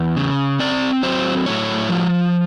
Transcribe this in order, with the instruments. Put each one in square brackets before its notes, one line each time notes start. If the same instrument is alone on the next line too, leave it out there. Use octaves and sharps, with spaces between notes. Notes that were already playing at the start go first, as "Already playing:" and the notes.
Already playing: [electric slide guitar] E2
C#3
C4 D5
F#3 C5
A2 C#5
F3